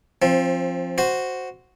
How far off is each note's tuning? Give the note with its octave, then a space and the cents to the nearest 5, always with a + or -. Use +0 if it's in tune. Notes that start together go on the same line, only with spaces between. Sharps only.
F3 +0 C4 +25
F#4 +0 C5 +0